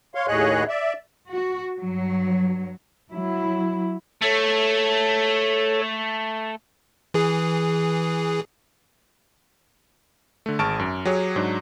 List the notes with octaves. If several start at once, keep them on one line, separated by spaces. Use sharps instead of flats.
C#5 F5 C6
D#2 A2 G#4 C#5 D#5 F#6
D5 E5
F#4
G2 F#3
F#3 E4
A3 A4 C#5
E3 G#4
D3 A3
G#1 G#4 A5 C#6 F6 D7
F#2
F#3 G4 G#4 C#5
G#2 F#3 D4